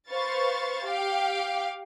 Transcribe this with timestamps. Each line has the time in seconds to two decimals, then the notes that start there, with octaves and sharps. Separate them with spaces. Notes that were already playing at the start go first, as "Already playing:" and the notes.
0.11 B4 C5 F5 C#6 A6
0.86 G4 F5 G5